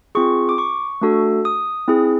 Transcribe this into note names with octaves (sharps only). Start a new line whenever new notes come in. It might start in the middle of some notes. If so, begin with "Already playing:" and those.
C4 F4 G#4 C#6
D6
C#6
A3 D4 F#4 A4
D#6
C4 E4 G#4